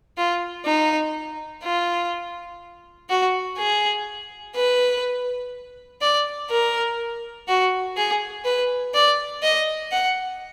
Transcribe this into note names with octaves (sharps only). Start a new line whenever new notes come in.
F4
D#4
F4
F#4
G#4
B4
D5
A#4
F#4
G#4
B4
D5
D#5
F#5